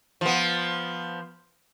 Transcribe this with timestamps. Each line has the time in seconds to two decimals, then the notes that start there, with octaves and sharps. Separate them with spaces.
0.21 F3 B3